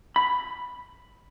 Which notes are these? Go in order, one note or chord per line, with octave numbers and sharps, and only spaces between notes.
B5